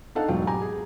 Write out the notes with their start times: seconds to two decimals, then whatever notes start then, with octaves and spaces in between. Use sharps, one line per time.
0.15 D4 D#4 A4 F5 F#5
0.28 E1 G#2 F#3 B3 F5 G5
0.47 G4 G#5 A#5
0.62 G#4